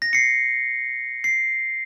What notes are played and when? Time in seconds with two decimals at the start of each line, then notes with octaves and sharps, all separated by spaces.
0.02 A#6
0.13 C7 C#7
1.24 C7